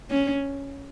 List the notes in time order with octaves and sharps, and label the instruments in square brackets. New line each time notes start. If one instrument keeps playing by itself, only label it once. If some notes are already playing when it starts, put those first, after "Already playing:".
[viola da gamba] C#4